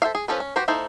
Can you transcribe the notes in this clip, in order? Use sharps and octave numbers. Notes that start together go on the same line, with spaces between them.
A4 C5 E5 F5
G#4
F3 C#4 A4 B4
C#4
F#4 G4 B4 C5
A#3 D#4 E4 A4 C5